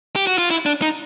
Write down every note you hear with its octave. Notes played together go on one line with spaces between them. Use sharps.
G4
F#4
F4
E4
D4
D#4